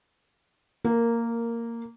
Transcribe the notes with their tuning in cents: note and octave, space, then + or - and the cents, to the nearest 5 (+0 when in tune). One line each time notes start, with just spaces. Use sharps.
A#3 -10 A#4 +0